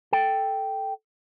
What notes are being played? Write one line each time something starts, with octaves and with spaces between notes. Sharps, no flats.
A4 G5